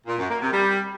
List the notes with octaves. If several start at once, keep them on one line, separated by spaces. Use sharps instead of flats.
A#2
F#2
A#3
C3
G3